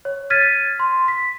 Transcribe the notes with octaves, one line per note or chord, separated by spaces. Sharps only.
C#5
F6 G#6 A6 B6 D#7
C6
B6